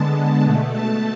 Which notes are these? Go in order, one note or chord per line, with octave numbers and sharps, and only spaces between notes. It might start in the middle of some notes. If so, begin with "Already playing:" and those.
Already playing: D3 G#3 B3 A5
A5
B2 A3
A5